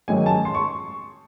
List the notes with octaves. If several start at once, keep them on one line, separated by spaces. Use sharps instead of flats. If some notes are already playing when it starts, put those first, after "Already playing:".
A1 G#2 D#3 F#3 G#5
A5
C6
C#6